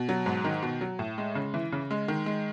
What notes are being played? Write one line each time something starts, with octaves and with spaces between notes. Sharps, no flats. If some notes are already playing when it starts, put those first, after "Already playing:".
Already playing: B2
F#3
G#2
D#3
B2
F#3
A2
G#3
C#3
E3
C#3
G#3
D#3
G#3